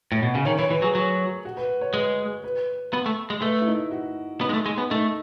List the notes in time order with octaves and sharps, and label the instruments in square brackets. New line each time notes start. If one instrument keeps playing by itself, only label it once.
[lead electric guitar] A2
B2
C#3
[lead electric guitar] D#3 [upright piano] C#5
[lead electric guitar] E3 [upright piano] C#5
[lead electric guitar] E3 [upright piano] B4
[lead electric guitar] F#3 [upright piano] G#4
[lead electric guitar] F#3
[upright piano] F#4
B4
C#5
[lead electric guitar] G#3 [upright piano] B4
[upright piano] B4
[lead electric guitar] B3
A3
G#3
[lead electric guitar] A3 [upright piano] B4
[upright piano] E4
D#4
F#4
[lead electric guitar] B3 [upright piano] D#4
[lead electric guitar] G#3
A3
G#3
B3
[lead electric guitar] A3 [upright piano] D#4